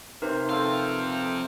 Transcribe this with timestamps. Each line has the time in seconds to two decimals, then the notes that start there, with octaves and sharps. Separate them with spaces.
0.22 C3 D#4 A#4 B4
0.49 F2 C3 A3 C4 F5